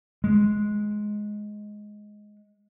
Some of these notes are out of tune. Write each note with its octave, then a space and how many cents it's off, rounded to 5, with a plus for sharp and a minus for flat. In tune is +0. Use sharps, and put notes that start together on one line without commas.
G#3 +10